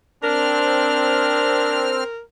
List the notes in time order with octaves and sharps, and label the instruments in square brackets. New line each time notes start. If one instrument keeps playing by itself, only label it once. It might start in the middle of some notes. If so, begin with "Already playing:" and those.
[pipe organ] C4 F6 [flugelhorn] D4 [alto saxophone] A#4